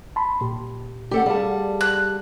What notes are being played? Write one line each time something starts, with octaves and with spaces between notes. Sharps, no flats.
A5 B5 C6
A#2 G4
A3 G4 A4 F#5
G3 G#4 D5 F5 A5
F#6